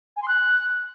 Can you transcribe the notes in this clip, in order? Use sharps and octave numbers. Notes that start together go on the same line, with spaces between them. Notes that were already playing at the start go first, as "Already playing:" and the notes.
G#5
C6
F#6